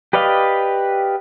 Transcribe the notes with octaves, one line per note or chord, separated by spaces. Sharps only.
G4 B4 D5 D#5 F5